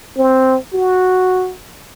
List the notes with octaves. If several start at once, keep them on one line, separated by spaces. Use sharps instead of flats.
C4
F#4